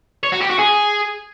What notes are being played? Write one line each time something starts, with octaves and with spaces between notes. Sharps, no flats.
C#5
F#4
G4
F#4
G#4